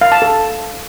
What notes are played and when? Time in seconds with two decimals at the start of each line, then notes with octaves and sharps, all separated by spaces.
0.01 F5
0.12 A5
0.22 A4